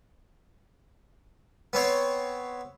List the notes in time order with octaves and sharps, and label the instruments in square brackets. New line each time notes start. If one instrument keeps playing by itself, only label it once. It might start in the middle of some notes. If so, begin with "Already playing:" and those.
[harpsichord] B3 C4 C#5